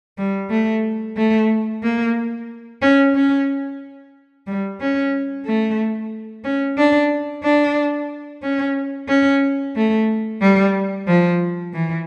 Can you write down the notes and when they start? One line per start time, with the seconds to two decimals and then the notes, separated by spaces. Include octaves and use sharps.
0.18 G3
0.50 A3
1.17 A3
1.83 A#3
2.82 C#4
3.15 C#4
4.47 G3
4.80 C#4
5.45 A3
6.44 C#4
6.77 D4
7.43 D4
8.42 C#4
9.08 C#4
9.75 A3
10.41 G3
11.07 F3
11.73 E3